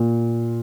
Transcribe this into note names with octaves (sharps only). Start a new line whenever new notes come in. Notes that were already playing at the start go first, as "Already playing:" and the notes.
Already playing: A#2